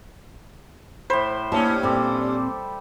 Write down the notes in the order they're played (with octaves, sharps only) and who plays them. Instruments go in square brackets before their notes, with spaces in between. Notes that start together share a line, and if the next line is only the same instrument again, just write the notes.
[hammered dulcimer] A2 B5 [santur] C5
[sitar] G2 C#4 [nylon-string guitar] A#3 E4 A5
[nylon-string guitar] A#2 C4 [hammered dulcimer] G3 A4 D6